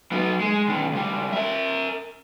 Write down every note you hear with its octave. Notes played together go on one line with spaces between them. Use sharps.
F#3 D#4
G#3
B2 D#3
C#2 G3
A#4 E5